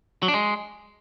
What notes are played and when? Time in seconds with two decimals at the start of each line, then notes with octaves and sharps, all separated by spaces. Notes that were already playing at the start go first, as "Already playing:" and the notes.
0.23 F#3
0.28 D4
0.34 G#3